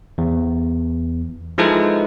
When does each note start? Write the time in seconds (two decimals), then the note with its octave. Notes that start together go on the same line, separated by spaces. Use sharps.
0.18 E2
1.58 F3 G#3 D#4 E4 A4 B4